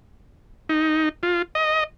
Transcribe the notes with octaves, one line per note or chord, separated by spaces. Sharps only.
D#4
F4
D#5